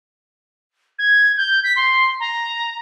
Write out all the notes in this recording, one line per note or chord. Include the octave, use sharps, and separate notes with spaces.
G#6
G6
B6
C6
A#5